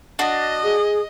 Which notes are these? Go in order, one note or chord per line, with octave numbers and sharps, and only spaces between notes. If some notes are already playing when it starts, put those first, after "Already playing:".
D4 F#4 D#5
G#4